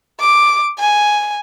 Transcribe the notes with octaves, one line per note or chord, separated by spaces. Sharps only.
D6
G#5